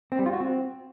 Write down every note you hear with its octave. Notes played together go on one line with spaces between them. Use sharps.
C4
G3
F4
F#4
C4